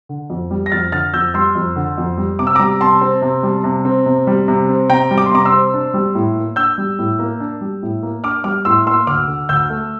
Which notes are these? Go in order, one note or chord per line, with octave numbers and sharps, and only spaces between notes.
D3
F2
G3
A#6
F2 F6 A6
D3 F6 A6
F2 E6 G6
G3 C6 E6
F2
D3
F2
G3
C3 D6
E6
G3 A#5 D6
C3 A5 C6
C4
C3
G3
C3
C4
C3
G3
C3
C4
C3 G5 A#5
G3
D6
C6
C3 A#5 D6
C6 E6
C4
D4
G3
A2
A#3
D4 E6 G6
G3
A2
A#3
D4
G3
A2
A#3
D4 D6 F6
G3 D6 F6
A2 C6 E6
A#3 C6 E6
D2 D6 F6
D3
D2 E6 G6
A3